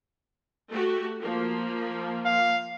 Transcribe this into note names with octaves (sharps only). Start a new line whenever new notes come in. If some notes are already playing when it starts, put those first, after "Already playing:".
A3 F#4 G4
F3 A#3
F5